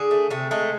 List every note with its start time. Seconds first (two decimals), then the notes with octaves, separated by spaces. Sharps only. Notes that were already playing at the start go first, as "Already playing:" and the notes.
Already playing: D3 G#4
0.11 A3
0.30 C3 A3
0.51 G#3 A3